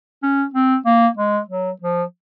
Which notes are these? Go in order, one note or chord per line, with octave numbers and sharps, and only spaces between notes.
C#4
C4
A#3
G#3
F#3
F3